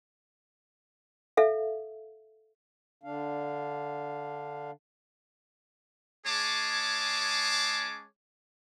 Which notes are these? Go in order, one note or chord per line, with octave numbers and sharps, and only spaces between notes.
A4 E5 F5
D3 D4 F5
G#3 C#4 G#4 C#5 A5 D6